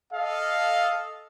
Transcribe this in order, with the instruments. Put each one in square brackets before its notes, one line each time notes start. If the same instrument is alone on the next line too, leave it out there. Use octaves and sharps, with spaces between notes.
[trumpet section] A4 D#5 F5